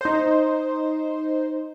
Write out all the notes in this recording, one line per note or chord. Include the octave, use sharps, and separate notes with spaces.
D#4 C5